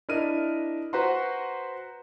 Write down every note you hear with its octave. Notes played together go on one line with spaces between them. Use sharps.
D4 E4 A#4 D#5 F6 D#7
F#4 B4 C5 F#5 A#5 C6